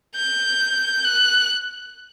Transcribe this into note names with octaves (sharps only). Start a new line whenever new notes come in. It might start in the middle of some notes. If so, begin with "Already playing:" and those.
G6
F#6